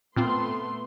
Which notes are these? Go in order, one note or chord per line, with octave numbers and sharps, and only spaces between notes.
A#2 A3 B3 C4 F4 C6